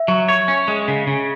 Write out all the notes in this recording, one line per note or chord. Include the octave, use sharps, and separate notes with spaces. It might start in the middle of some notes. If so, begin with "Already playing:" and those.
Already playing: E5
F#3
C#5
C#4
G#3
C#3
C#3